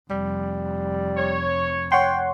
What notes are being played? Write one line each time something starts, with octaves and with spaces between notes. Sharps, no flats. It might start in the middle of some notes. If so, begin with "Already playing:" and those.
F1 F2 G3
C#5
C#5 F#5 G5 C6